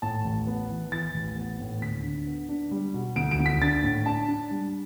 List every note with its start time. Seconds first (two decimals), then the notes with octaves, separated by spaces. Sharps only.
0.02 A2 A5
0.24 A1
0.47 B3
0.70 E3
0.92 E3 A6
1.14 A1
1.36 B3
1.60 A2
1.81 D2 B6
2.04 D3
2.27 B3
2.49 D4
2.71 G3
2.94 B2
3.16 D2 D7
3.31 D7
3.39 D2
3.46 B6
3.61 D4 A6
3.84 A2
4.06 D4 A5
4.29 D4
4.51 G3